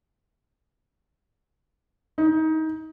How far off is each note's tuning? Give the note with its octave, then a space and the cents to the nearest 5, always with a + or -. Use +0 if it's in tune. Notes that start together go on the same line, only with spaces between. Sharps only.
D#4 +25